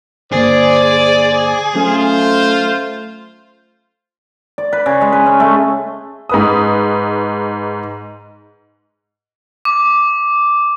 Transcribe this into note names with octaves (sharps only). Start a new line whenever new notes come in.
G2 D3 A#3 G#4 C5 D5
F#3 A3 C#4 F4 C5
D5
B4
C#3
G#3
B4
C#4
A3
G#2 B4 D#6
D6